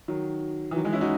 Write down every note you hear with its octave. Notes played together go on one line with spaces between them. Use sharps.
D#3 F#3
E3
D#3 F#3
E3 G#3
C#4 E4
D#4 F#4